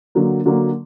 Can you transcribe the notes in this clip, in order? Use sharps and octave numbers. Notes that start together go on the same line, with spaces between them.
D3 F#3 A#3
D3 F#3 A#3